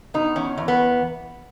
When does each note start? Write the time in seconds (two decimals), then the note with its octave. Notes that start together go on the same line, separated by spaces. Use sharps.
0.14 B2 D#4
0.36 E2 C#4
0.58 E2
0.68 B3